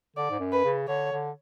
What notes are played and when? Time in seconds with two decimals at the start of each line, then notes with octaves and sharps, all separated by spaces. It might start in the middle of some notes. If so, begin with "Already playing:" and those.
0.16 D3 D5
0.30 G#2
0.40 F#2
0.52 B4
0.64 C#3
0.88 D3 C#5
1.12 D3